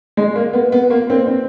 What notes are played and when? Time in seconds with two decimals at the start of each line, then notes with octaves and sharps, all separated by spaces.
0.17 G#3
0.36 A#3
0.53 B3
0.72 B3
0.90 A#3
1.10 C4
1.28 C4